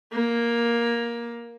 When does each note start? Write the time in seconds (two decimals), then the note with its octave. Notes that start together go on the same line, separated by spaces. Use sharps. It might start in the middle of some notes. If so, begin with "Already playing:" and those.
0.13 A#3